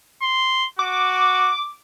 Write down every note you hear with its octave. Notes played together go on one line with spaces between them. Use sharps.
C6
F#4 D6